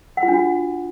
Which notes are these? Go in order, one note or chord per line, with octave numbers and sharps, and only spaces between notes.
F#5
F4
D4
F#4